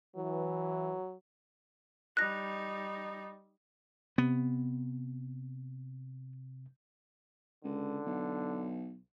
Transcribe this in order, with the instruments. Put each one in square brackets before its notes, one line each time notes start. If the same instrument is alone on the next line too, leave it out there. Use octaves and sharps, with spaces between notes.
[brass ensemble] E3 [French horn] F#3
[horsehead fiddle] G3 D#4 [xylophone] F#6 A#6
[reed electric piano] C3 [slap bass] B3
[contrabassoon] C#2 [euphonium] D3
[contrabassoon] B1